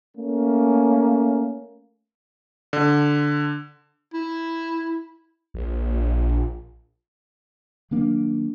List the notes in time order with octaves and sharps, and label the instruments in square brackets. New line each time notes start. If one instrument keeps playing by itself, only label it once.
[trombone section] A3 A#3 C#4
[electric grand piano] D3
[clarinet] E4
[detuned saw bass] A#1
[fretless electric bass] D#3 F#3 A#3 D4